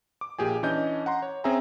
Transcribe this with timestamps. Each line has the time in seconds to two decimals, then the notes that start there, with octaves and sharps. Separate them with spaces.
0.21 D6
0.39 A#1 A#2 G4 G#4 G#5
0.63 E3 C#4 D4 D#5 G6
1.06 F#5 A#5 C6
1.22 C#5
1.44 C4 C#4 G#4 E5 G#5 A#5